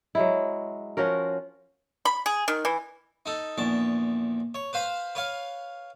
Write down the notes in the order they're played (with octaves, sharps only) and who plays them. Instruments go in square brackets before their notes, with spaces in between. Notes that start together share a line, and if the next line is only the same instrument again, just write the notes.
[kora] F#3 G#3 E4
F3 C#4 F#4 A#4
[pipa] B5
G#4
D#3
E3
[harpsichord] D#4 A4
A#1 E2 A5
C#5
B4 C5 F5 B5
B4 C#5 F5